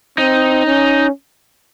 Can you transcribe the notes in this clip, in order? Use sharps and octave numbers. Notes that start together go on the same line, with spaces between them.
C4 D#4
C#4